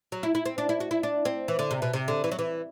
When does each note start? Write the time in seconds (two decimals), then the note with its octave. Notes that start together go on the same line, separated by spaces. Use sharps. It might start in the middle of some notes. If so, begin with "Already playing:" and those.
0.12 F#3
0.23 E4
0.35 E4
0.45 C4
0.58 D4
0.69 E4
0.80 F#4
0.91 E4
1.03 D4
1.25 C4
1.48 E3
1.59 D3
1.71 C3
1.82 B2
1.93 C3
2.08 D3
2.24 E3
2.32 F#3
2.39 E3